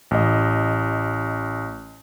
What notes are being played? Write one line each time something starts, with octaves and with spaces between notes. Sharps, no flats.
A1 D#5